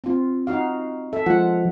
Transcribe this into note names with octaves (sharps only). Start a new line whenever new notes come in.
C4 F4
D#4 F#4 F5
A4 E5
F3 G#3 F4 F#5